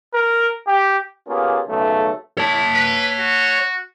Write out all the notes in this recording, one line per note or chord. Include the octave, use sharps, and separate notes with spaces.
A#4
G4
A#3 B3 C#4 F4 G4 G#4
B1 C#3 A3
E4 C#5 A5
B4
F#4